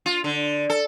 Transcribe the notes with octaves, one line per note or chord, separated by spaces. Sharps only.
F4
D3
A4